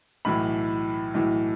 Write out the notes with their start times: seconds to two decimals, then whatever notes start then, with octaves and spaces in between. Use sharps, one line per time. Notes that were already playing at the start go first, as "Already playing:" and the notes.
0.25 B1 A2 E3 B5
1.14 B1 A2 E3